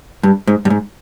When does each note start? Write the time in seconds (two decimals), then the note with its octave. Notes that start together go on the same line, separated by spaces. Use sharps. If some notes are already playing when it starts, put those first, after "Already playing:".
0.23 G2
0.47 G#2
0.65 G2
0.70 G#2